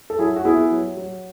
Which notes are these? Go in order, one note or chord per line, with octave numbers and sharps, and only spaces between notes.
A4
F#3 E4 G#4
F#4
B3 E4 G#4
F#3
F#3